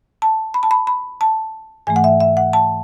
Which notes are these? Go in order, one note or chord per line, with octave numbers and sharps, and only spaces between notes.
A5
B5
A5
B5
B5
A5
G#2 E3 A3 G#5
F#5
E5
E5
F#5
A5